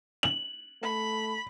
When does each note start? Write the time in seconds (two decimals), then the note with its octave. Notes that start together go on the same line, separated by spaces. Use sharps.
0.23 F#7
0.83 A3 B5